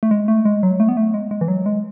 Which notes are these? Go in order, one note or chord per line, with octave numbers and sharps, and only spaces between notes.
A3
G#3
A3
G#3
F#3
A3
B3
A3
G#3
G#3
E3
F#3
G#3